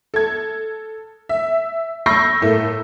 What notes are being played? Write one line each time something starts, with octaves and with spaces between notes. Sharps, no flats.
A4 G#6
E5
B5 C#6 E6 G6 A#6 C7
A2 A3 A#3